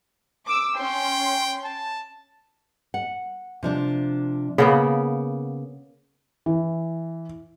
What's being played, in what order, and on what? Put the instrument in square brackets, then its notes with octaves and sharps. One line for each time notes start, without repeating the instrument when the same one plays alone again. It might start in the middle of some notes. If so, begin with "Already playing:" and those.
[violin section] D6 E6
[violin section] C#4 C6 [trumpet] G5
[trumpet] A5
[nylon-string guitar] F#5
C3 F3 D4
[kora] C#3 A#3 B3 [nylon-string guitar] F#5
[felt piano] E3